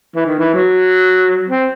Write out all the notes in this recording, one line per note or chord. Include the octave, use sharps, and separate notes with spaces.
E3
D#3
E3
F#3
C4